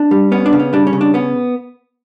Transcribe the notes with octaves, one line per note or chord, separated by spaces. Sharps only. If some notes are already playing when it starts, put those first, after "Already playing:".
Already playing: D4
G3
B3 C#4
D4
C#3
C#4
G3 D4
C#4
C#3
D4
B3 C#4